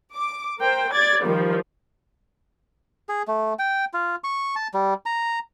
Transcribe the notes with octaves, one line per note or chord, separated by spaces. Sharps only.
D6
A#4 C5 G5
D5 G#6 A6
D#3 F3 G3
G#4
A3
G5
F4
C#6
A5
G3
A#5